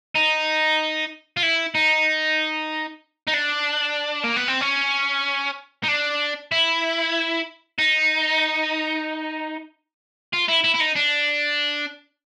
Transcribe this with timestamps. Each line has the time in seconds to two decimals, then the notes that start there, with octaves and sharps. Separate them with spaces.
0.16 D#4
1.37 F4
1.43 E4
1.75 D#4
3.27 D#4
3.33 D4
4.23 A#3
4.36 B3
4.48 C4
4.61 C#4
5.84 D#4
5.88 D4
6.52 E4
7.79 D#4
10.33 F4
10.48 E4
10.64 E4
10.75 E4
10.80 D#4
10.96 D4